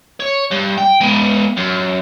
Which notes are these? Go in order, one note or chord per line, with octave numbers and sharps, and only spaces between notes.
C#5
G2
G5
G#3 B3
F#2